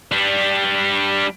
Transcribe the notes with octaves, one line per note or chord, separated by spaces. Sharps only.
G3 D4